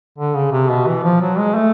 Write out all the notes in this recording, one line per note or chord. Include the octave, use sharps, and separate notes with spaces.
D3
C#3
C3
B2
E3
F3
F#3
G#3
A3